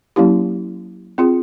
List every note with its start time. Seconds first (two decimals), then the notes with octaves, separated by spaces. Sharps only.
0.16 F#3 A#3 C#4 E4 G4
1.18 C4 F4 G#4